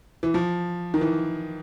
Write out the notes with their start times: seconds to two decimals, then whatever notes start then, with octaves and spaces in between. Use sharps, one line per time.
0.23 E3
0.34 F3
0.94 D#3
1.01 E3